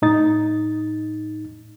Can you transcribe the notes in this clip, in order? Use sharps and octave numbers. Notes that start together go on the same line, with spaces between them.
A2 D#4 A6